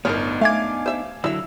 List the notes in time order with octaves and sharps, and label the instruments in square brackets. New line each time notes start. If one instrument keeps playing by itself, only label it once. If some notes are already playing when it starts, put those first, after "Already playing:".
[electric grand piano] G1 A2 F6 [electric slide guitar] B3 D4 D#4 [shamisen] A#4 C#5
[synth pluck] A3 G#6 [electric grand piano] F5 G#5 D6
[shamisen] C5 E5
[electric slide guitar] D3 F#3 [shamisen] E4 E5 [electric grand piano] E6